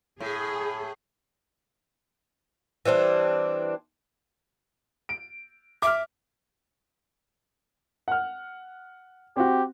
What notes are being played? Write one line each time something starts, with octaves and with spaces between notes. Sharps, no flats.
A2 G#4
E3 G3 C4 D4
D7
E5 D6 F6
F#5 F6
C4 F#4 G4